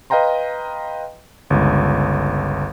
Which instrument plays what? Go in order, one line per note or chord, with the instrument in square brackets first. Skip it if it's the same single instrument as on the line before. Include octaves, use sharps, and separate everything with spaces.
[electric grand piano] B4 D#5 F5 G5 A#5 C6
G1 C#2